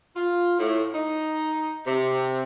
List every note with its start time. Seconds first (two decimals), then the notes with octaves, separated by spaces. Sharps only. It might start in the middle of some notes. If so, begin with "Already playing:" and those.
0.16 F4
0.59 A2
0.94 D#4
1.87 C3